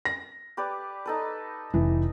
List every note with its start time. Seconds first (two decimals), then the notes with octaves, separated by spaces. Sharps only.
0.05 A#6
0.57 G4 B4 D5
1.06 D#4 A4 B4
1.74 F1 E3